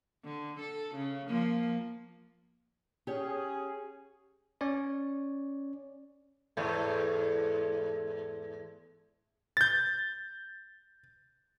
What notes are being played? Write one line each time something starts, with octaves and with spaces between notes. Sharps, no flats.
D3
A4
C#3
F3 A#3
C#4 G4 G#4 C#5 F#5
C#4 C#5 D5
E2 G#2 A3
G6 A6